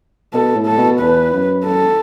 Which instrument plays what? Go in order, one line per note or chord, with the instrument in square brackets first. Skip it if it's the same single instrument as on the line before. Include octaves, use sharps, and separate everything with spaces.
[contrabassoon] B2 [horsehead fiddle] A4
[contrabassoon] A2
[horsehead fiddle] A4
[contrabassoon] B2
[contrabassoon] E2 [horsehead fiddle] B4
[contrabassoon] F#2
[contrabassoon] F#2 [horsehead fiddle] A4